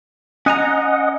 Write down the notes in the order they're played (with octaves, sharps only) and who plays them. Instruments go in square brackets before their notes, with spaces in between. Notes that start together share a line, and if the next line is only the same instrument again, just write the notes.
[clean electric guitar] C#4 G#5 A#5 [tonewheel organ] D#5 F#5